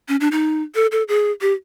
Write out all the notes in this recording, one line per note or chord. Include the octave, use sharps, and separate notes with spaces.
C#4
D4
D#4
A4
A4
G#4
G4